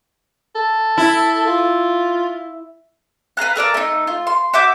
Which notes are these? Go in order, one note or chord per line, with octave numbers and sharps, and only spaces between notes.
A4
E4
F4
B4 F5 A#5 F#6
A4 A#4 D5 A#5
A3 D#4
F4
C6
F#4 E5 D6 G6